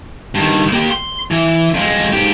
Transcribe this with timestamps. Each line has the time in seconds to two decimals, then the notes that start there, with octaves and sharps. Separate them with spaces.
0.35 G2 D#3
0.72 A#3 G4
0.91 C6
1.31 E3
1.74 F2 G#3
2.13 G#2 G4